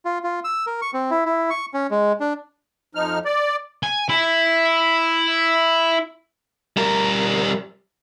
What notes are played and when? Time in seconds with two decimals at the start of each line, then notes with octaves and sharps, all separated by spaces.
0.05 F4
0.24 F4
0.44 E6
0.67 A#4
0.82 C#6
0.93 C4
1.11 E4
1.25 E4
1.50 C#6
1.74 C#4
1.91 G#3
2.20 D4
2.95 F2 F3 D#4 F6
3.25 D5
3.83 G#5
4.09 E4
6.77 G3 A#4